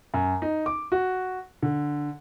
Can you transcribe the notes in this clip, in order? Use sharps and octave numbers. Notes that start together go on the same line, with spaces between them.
F#2
D#4
D6
F#4
D3